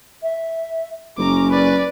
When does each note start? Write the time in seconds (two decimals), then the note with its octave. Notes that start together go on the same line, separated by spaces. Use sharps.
0.23 E5
1.18 F#1 C#4 A#5 D6
1.50 B4 D5